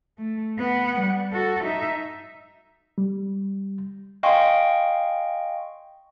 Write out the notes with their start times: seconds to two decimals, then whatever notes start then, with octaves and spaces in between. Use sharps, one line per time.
0.18 A3
0.58 B3 F#5
1.00 G3
1.33 F#4 A4
1.64 D#4 E5
2.98 G3
4.23 D#5 F5 G5 G#5 C6 C#6